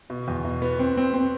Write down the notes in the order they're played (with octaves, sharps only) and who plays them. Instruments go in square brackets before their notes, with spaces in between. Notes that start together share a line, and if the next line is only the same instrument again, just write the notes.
[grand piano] B2
E2
B2
B3
C4
C4
C4